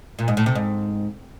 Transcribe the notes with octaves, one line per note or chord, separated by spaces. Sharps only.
A#2
G#2
A2
C3
G#2